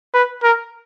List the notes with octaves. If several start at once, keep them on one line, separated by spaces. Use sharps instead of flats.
B4
A#4